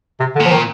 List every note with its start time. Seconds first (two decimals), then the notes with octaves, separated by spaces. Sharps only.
0.20 C3
0.36 D3
0.40 A#2
0.45 F3
0.51 D#3